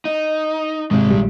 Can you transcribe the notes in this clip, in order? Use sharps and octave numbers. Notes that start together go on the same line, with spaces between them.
D#4
G#2 C3 D#3 G#3
A#1 G3